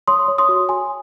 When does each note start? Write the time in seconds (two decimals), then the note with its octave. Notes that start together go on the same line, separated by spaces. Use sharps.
0.08 C#5 C6 D#6
0.28 C#5
0.38 C6 D#6
0.49 F#4
0.69 F#4 G#5 C6